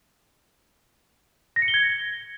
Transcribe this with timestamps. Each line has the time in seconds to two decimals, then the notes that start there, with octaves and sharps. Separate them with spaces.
1.56 A#6
1.62 C#7
1.68 G7
1.74 G#6